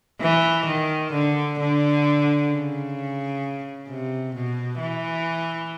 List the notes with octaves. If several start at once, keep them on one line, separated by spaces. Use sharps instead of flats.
E3
D#3
D3
D3
C#3
C3
B2
E3